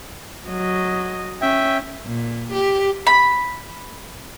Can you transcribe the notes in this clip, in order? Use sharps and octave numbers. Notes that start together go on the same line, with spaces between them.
F#3 D#5
C#4 E5 G5
A#2
G4
B5